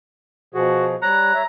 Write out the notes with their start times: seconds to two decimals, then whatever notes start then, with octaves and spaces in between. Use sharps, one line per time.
0.54 B2 F3 F#4 G#4
1.02 G3 C#5 A#5 F#6
1.34 C#5 E5